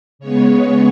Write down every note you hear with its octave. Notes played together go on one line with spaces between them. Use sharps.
C#3 G#3 B3 C#5